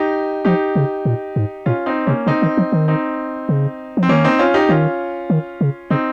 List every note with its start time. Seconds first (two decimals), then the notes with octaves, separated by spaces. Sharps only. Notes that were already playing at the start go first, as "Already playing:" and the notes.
Already playing: D#4 G4
0.45 F3 D#4 G4
0.76 C#3
1.05 A#2
1.36 G#2
1.66 A#2 C#4 F4
1.86 C4 D#4
2.06 C3 A#3 C#4
2.27 C#3 C4 D#4
2.42 D#3
2.58 F3
2.72 D#3
2.88 C4 D#4
3.49 C#3
3.97 F3
4.03 C4
4.09 D#3 A#3 C#4
4.24 C4 D#4
4.39 C#4 F4
4.54 D#4 G4
4.69 D#3 C#4 F4
5.30 D#3
5.61 C#3
5.90 C#3 C4 D#4